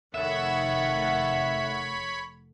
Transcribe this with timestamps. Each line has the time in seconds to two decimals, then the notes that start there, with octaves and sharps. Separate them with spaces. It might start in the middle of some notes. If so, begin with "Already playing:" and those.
0.14 F1 D#3 A4 C#5 E5 F#5 B5